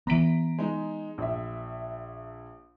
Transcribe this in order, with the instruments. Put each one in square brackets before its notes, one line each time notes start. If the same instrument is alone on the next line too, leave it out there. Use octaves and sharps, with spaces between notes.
[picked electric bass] E3 B3 [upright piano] A#5 B6 D7
[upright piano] G#3 D#4
A#1 E5